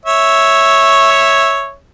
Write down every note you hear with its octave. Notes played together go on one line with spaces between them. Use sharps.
C#5 E5